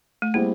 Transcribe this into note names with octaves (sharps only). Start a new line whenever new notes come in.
A3
G3 A#3 C4 E4 G#4